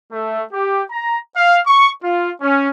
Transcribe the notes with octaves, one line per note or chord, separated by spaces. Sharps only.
A3
G4
A#5
F5
C#6
F4
C#4